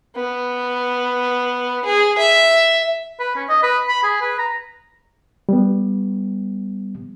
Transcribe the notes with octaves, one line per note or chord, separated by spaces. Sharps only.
B3
G#4
E5
B4
C#4
D#5
B4
B5
G#4
B4
A#5
G3 B3